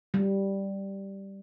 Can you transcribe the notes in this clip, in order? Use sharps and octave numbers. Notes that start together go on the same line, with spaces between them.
G3